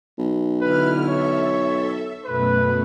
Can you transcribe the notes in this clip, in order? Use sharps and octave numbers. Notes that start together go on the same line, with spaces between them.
B1
D3 E4 B4 F6
A4 C#5 E5
F#2 B2 A3 B4